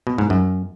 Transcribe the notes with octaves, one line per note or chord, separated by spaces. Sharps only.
B2
G#2
F#2